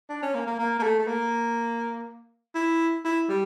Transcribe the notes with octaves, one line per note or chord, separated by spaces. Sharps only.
D4
C#4
A#3
A#3
A#3
A#3
A3
A3
A#3
E4
E4
G3